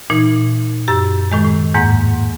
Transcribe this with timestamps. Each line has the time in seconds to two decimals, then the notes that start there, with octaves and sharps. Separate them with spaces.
0.10 A#2 E3 D#4
0.88 F#2 G4 E6
1.31 A2 D#3 G#3
1.45 A2
1.74 E2 G#2 A#3 F#5 A#5